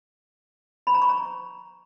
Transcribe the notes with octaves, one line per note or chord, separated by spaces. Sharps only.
B5
A#5
C#6
A#5